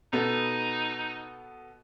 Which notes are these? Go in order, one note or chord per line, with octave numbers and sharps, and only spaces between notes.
B2 B3 D#4 A4